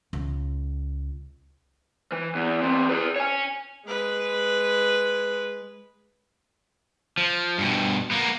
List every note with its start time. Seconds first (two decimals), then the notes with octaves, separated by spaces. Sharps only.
0.13 C#2
2.12 E3
2.35 E2
2.62 E3 C4
2.89 G#4 B4
3.16 C#5 G#5
3.86 G#3 B4
7.18 F3
7.58 G2 B2
8.11 A#3 B3